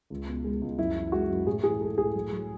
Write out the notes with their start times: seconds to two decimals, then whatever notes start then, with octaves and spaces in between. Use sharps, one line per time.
0.10 C#2
0.28 B2
0.45 G#3
0.62 C#2
0.79 F#2 E4
0.96 E3
1.12 G#3 F#4
1.30 F#2
1.47 A2 G#4
1.63 E3 G#4
1.81 G#3 A4
1.98 A2 G#4
2.14 F#3
2.32 F#3